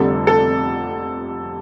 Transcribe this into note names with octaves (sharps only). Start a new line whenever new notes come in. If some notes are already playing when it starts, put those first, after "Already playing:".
Already playing: F1 F2 D3 G3 A4
A4